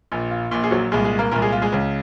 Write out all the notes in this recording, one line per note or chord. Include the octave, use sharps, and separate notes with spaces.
A#1 A#2
F4
A#1 A#2
G#4
F#3 F#4
C2 A#2 G#3 G#4
G#3 G#4
A#3 A#4
C2 A#2 A#3 A#4
G#3 G#4
F4
G#3 G#4
C#2 C#3